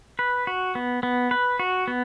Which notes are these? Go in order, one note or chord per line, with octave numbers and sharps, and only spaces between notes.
B4
F#4
B3
B3
B4
F#4
B3